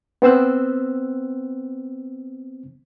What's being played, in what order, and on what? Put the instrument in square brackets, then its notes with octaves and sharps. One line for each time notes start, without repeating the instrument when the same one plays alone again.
[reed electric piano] B3 C4 C5 E6 F#6